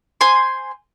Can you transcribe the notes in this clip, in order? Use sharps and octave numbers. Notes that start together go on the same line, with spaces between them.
C5 G#5 C6